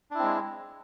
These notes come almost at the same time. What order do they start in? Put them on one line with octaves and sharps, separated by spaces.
D4 E4 C4 G#3